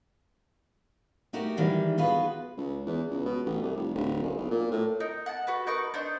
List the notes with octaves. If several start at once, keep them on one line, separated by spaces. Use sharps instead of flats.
A3 D#4 F#4 G4 A#4
D#3 E3 G3 G#3
B3 F4 F#4 G#4 B4
C#2
E2
C#2
B2
A1
C2
F1
D1
F#1
B1
A#2
A2
D#4 A#4
F#5 A5
F#4 A4 B4
D#4 A#4 B4 C#6
D4 D#4 C5